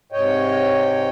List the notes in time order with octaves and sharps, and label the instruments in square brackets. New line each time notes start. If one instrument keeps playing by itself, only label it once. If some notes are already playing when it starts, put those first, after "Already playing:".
[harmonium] G#2 C3 C#5 D#5 G5